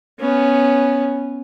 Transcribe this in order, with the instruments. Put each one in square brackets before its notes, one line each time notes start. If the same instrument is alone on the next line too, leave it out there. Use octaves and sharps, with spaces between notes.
[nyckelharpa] B3 C#4